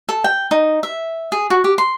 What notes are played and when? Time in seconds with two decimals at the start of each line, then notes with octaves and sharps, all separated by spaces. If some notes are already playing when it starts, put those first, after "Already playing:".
0.09 A4
0.24 G5
0.51 D#4
0.83 E5
1.32 G#4
1.50 F#4
1.64 G4
1.78 C6